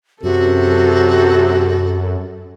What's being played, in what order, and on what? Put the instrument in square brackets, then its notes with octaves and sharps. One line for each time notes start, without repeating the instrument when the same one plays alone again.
[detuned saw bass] F#2 [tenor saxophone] C3 [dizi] F#4 [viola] A4